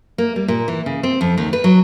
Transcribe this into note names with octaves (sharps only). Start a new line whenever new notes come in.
A#3
G3
A#2
E3
C#3
C4
F2
D#2
B4
F#3